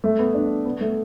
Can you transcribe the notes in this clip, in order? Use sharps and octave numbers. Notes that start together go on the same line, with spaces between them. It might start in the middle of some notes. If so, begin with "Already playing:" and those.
A3
B3
D4
B3
A3